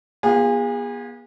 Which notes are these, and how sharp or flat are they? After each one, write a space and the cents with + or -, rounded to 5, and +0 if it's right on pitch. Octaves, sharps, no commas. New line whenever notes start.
B3 -40 F4 +0 G#4 -30